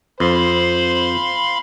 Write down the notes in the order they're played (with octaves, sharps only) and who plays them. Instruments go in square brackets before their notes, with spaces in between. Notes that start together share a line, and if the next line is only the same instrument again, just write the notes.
[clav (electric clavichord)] F2 [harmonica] C5 [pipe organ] F5 B5 C6